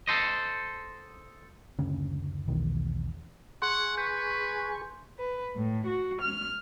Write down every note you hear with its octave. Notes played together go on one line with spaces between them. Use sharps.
A4 C5 D#5
F#1 D2 C#3 C#4
E1 B1 E2 D#3
G#4 F#5 G#5 C6 C#6
B4 G6
B4
A2
F#4
F6